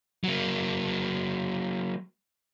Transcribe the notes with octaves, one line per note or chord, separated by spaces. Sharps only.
F#3 A#3